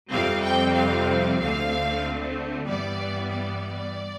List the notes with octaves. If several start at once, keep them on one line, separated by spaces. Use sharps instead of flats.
F2 C3 G3 C4 F5
G5
F5
D2 D3 A3 C4 F5
G2 E3 G3 B3 D5
D5